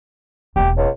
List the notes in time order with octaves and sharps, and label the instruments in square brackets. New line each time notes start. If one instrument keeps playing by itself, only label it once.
[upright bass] E1 B3 [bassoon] G4
[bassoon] C#2